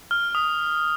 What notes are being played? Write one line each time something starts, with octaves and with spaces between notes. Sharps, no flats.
F6
D#6